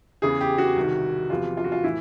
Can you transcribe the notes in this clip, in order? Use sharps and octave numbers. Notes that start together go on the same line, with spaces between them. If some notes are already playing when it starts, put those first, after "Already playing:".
E2 C#3 E3 G#4
G4
F#4
C2 C3 D#3
E2 C3 F3 F4
F4
F#4
F4
A2 E3 E4